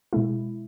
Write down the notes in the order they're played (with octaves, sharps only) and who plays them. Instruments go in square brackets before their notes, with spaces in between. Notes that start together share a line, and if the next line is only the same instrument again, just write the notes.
[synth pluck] B2 G#3 E4